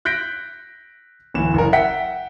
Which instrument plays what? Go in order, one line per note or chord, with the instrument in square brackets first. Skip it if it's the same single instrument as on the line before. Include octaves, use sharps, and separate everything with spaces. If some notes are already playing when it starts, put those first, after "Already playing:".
[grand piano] F#6 G6 A#6 B6 D7
D1 E3 E7
F#1 A#4
E5 F#5 G5 B6